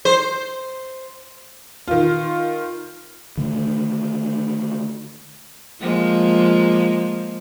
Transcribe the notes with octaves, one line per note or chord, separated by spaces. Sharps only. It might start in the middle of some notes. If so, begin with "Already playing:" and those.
C5
D#3 F4
D3 D#3 A3
F3 G#3 A#3